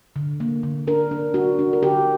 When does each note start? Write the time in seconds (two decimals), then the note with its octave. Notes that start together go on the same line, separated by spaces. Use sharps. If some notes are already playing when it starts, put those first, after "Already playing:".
0.16 D3
0.40 A#3
0.63 D3
0.87 D4 A#4
1.11 D4
1.34 D4 F#4
1.59 D4
1.73 A#4
1.82 D3 G4